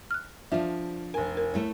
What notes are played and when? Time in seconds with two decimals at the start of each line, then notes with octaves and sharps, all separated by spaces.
0.11 F6 F#6
0.52 F3 D4 F4 E5
1.14 F1 A#4 G#5
1.37 A#4
1.54 A3 E4 C#5